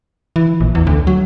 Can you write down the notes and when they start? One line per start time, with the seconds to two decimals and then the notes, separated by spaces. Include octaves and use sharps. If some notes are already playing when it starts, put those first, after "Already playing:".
0.36 E3
0.60 A#1
0.75 E2
0.87 D2
1.07 F#3